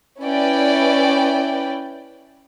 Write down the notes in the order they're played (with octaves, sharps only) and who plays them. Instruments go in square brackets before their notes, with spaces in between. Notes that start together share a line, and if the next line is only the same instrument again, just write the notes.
[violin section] C#4 E4 B4 D5 G5